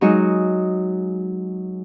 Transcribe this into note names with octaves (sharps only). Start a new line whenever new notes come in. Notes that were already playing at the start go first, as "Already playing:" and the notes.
F#3 G#3 D#4 F#4 D#5